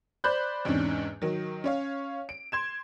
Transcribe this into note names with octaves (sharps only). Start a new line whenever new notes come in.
C5 D5 B5 F#6 G6
E2 G#2 C3 C#4 D4
D#3 F#3
C#4 C#5 F5
D7
C6 G#6 E7